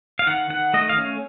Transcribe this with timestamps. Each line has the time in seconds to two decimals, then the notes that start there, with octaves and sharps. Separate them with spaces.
0.19 F5
0.27 D#3 F#5
0.50 D#3 F#5
0.74 A3 D#5
0.89 F5
0.98 C#4